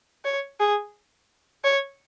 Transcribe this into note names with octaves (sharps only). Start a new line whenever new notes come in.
C#5
G#4
C#5